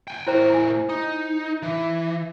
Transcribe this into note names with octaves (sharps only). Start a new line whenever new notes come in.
G5 G#5
A2 E4 A#4 C5 A#5
E4 G#5
D#4 D#6
E3